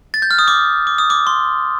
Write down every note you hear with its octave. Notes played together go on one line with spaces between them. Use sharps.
A6
G6
F6
D#6
D6
D6
D#6
D6
C6